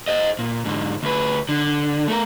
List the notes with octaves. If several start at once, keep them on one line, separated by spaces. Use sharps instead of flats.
C5 D#5
A#2
G#2 D3
D2 B4
D3
A3 A#4